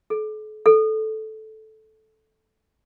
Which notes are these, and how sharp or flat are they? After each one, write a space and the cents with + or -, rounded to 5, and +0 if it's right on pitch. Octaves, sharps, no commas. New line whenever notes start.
A4 -40
A4 -10